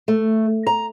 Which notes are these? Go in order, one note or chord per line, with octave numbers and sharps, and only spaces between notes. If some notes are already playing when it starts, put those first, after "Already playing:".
A3
A#5